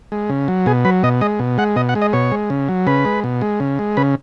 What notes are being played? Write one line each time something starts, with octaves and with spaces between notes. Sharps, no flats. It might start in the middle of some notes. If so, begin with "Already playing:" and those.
G#3
C#3
F#3
B2 G#4
F#3 B4
B2 D#5
G#3 D#5
B2
G#3 F#5
B2 D#5
F#5
G#3
D#5
B2 C#5
G#3
C#3
F#3
C#3 B4
G#3
B2
G#3
C#3
G#3
C#3 B4